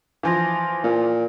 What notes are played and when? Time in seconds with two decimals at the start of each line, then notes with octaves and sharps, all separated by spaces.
0.23 E3 F3 F4 F5 G#5 A#6
0.84 A#2